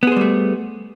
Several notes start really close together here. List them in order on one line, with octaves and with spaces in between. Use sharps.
B3 G#4 C5 G3 A3